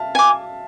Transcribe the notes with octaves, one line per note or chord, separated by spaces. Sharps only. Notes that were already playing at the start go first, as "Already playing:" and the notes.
Already playing: E5 F5 A5
G#5 D6